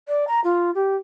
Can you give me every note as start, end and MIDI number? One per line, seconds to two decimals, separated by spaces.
0.07 0.25 74
0.27 0.40 82
0.44 0.70 65
0.74 0.95 67